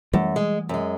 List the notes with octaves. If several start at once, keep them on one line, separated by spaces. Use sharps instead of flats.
F#2 E3 G3 A3
G#3
F#2 G#3